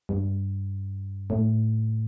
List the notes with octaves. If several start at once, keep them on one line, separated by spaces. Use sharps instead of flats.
G2
A2